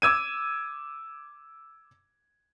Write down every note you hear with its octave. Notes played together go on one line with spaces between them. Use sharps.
D6 E6 G#6 D#7